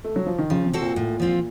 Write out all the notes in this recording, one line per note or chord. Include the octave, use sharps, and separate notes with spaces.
A3
F#3
F3
D#3
C#3 F3
C3
C4 F#4 A4
A#2
A2
F3 C4 F4